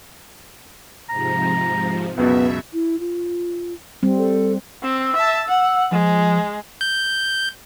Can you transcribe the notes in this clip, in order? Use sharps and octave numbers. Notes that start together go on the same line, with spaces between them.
G#2 C3 F3 A#5
C#2 F#2 B2 B3 E5
E4
F4
G3 C4
A4
C4 E6
E5 A5
F#5
F3 G#3
G6